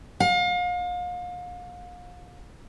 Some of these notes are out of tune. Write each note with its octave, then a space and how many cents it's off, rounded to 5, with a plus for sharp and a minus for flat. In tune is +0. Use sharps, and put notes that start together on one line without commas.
F5 +35